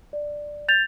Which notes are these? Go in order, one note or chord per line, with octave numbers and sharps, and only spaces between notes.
D5
G6 A6 F7